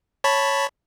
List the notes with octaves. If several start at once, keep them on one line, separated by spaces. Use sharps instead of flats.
C#5 A5 B5